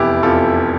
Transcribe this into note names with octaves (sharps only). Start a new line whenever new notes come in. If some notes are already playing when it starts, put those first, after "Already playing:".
Already playing: F1 E2 C3 E4 G4
F1 E2 C3 F4 A4